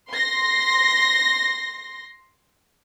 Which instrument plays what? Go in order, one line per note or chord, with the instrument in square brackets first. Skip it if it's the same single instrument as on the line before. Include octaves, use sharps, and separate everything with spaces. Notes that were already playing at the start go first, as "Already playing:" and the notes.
[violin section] C6 A#6